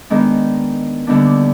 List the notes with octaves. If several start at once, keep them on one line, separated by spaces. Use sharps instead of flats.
G#2 D#3 G#3 B3 D4
D#2 D3 G3 B3 D4